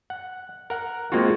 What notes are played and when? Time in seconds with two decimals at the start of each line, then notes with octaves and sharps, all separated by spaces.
0.10 F#5
0.70 A#4 F#5
1.12 G#3 A#3 C4 F4 F#4